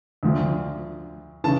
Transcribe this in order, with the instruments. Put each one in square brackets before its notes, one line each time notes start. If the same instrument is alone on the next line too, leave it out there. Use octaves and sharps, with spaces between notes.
[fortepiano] D2 D3 F3
[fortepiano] C#3 E3 [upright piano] A5